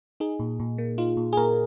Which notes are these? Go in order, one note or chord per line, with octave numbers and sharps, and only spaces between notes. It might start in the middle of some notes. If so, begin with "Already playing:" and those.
D#4 G#4
A#2
A#2
A#3
D#4 F4
A#2
G#4
A#2 A#4